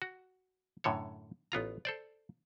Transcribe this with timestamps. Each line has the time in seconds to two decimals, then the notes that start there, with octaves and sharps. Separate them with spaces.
0.02 F#4
0.84 F#2 A2 D3 A4 C#5
1.52 A1 B3 F4 A#5
1.85 A4 C5 D5